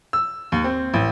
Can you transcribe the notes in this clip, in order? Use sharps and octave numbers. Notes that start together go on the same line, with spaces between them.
E6
D#2
C4
A1